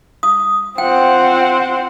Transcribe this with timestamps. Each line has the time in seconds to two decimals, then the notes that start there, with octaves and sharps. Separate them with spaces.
0.23 D#6
0.78 C4 F4 F#5 G5 C6